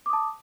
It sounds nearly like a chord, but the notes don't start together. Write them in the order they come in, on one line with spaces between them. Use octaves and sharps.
D6 D#6 A5